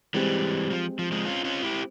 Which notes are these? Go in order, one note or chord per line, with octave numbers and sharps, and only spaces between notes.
E3 G3 G#3 C4 G4
F3
F3
F3 G#3
C#4 F4
C#4 F4
E4 G4